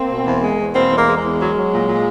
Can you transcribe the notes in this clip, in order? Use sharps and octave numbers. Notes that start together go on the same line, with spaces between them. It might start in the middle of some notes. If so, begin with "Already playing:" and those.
Already playing: A#3 C4
B2
E2
G#3
E2
B2 A#3 C4
E2
G#3 A#3
G#3
G#3
E2
F#3
F#3
A#2
A#2